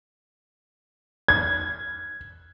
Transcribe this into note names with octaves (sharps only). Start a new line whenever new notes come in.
G#6